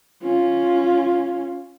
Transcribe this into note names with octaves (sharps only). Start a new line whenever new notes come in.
C#4 F4